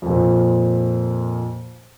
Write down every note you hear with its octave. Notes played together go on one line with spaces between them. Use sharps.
F2 A#2